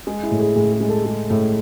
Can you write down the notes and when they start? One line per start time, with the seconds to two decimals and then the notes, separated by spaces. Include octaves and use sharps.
0.07 G#3 G#4
0.23 E4
0.31 A2
0.40 G#4
0.56 A2 G#4
0.72 G#4
0.80 G#3
0.89 A4
1.05 G#3
1.30 A2